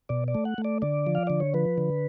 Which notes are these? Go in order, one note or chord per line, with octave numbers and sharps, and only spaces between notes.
B2 D5
D5
A3
F#5
A3
D5
D3 D5
F3
F5
D3 D5
C#5
F3 B4
D3